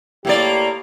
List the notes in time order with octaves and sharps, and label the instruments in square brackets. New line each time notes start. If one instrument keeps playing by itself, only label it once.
[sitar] A2 A#3 D5 [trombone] G4